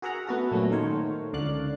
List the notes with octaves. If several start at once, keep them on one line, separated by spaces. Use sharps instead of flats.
F#4 G#4 A#4 E5 F#5 A#5
A3 B3 F#4 A4
A#2 F#3 A3 B3 C#4
D#3 A3 A#4 C5 C#5
C#2 D3 D5 F5 D6 F#6